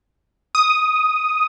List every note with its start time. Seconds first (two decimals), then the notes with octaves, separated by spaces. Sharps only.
0.55 D#6